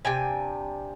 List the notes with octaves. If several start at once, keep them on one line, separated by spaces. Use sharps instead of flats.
C3 D4 G5 G#5